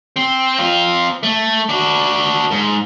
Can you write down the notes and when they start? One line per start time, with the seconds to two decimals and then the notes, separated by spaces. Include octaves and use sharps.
0.16 C4
0.59 C4 F4
1.23 A3
1.69 D4 F#4
2.51 G#2